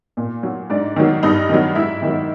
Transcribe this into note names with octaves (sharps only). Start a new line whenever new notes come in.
A#2
F#3
G#2 D4 D5
D#3 F#3
G2 D#4 D#5
D#3 F#3
G#2 E4 E5
D#3 F#3